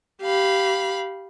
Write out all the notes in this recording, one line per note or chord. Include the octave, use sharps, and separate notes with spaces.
G4 F5 B5